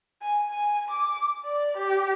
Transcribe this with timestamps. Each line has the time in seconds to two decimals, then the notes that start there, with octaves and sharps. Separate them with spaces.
0.22 G#5
0.51 G#5
0.91 D6
1.45 D5
1.77 G4